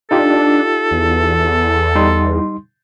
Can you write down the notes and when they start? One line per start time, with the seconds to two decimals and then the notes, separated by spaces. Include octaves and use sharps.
0.11 D4 D#4 F4 G4 A4
0.91 E2
1.95 G3 D#4 C6